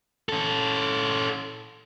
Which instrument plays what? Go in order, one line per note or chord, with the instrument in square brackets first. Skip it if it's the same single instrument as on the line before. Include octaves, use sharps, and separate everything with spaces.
[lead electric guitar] C#4 A4